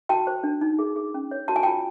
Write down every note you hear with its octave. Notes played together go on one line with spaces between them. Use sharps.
F#4 G5 A5
C5
D4
D#4
G#4
G#4
C#4
C#5
F#4 A5
G#5
F4 G5 A5